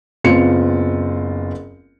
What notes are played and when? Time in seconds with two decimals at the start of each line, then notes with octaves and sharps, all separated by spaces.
0.24 F#1 B3 C4 F4 C#7